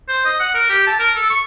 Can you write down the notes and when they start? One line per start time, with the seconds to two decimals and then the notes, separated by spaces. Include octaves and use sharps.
0.08 C5
0.25 D#5
0.40 F#5
0.55 A#4
0.70 G4
0.87 A5
1.00 A#4
1.16 A4
1.30 C#6